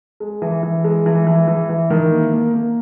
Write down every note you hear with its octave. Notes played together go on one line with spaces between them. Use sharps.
G#3
E3
E3
G#3
E3
E3
E3
E3
D#3
A#3
A#3
A#3